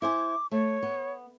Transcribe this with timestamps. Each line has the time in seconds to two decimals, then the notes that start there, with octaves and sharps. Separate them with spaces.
0.02 E4 C5 G#5 D6
0.52 A3 C#5
0.83 B3